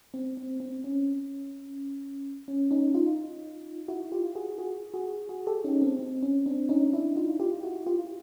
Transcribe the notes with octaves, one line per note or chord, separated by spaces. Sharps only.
C4
C4
C4
C#4
C#4
C#4 D#4
D#4 F4
E4 F#4
F4 G4
F#4 G#4
F#4 G#4
F#4 G#4
F#4 G#4
G4 A4
C#4 D#4
C4
C4
C#4
C4 D4
C#4 D#4
D4 E4
D#4 F4
F4 G4
E4 F#4
F4 G4